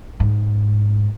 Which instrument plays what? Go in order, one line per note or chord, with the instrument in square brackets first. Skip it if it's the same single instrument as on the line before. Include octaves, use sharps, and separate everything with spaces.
[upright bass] G#2